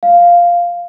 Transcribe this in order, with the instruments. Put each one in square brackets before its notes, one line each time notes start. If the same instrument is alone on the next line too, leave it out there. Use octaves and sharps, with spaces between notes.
[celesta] F5